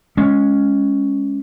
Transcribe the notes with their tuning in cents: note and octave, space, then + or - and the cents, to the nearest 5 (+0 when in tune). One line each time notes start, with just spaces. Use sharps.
G#3 +0 C#4 +5